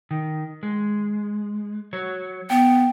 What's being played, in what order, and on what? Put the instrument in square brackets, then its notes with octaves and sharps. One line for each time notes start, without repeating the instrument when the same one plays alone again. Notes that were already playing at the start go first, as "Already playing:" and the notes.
[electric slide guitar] D#3
G#3
F#3 C#5
[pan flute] B3 [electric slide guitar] G5